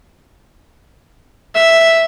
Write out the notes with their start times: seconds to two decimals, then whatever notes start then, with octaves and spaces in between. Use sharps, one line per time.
1.55 E5